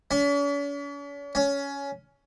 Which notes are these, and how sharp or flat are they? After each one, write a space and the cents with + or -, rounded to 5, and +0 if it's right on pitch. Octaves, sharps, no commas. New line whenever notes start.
C#4 +45
C#4 +15